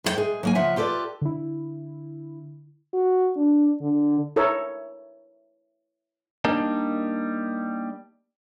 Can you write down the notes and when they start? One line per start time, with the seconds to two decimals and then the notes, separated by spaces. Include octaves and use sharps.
0.04 F2 F4 G5
0.17 G#3 G#4
0.43 F#3 A#3 G#5
0.55 C#3 F3 F4 E5 F#5
0.76 F4 G4 A4 B4 D5
1.21 D3 E4
2.93 F#4
3.37 D4
3.82 D3
4.36 E4 A4 A#4 C#5
6.45 G3 A#3 D4 D#4